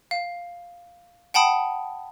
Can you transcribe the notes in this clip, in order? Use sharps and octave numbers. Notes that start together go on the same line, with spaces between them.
F5
F#5 G5 A5 B5 D#6